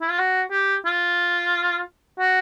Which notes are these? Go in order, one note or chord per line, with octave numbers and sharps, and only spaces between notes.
E4
F4
F#4
G4
F4
F#4